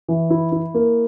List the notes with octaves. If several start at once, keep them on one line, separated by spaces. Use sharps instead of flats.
E3
E4
E4
A#3